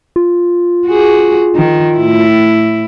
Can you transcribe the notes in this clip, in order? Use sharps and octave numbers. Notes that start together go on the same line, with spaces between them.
F4
F#4 G#4
D#3
A2 E4